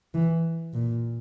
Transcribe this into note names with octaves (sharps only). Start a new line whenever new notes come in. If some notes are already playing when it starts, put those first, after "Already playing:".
E3
A#2